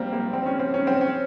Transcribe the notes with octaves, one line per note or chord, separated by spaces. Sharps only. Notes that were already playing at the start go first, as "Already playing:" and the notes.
Already playing: G3 A#3 C4
A#3
C4
C#4
C4
C#4
C4
C#4